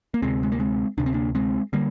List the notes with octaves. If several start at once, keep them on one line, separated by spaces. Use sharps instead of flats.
A#3
D2 C3 G#3 C4
G#3
A#3
G#3 C4
D2 C3 D4
C4
A#3 D4
G#3 C4
D3 G3 A#3